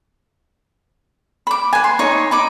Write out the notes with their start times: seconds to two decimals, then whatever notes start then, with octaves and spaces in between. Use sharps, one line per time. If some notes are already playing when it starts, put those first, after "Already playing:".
1.47 B5 D6
1.73 B4 G#5
1.84 C6
1.99 D#4 C#5
2.31 D#4 B5 D6